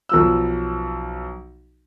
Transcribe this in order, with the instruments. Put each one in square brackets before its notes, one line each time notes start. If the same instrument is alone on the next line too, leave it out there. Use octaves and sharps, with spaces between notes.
[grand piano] B1 F3 E6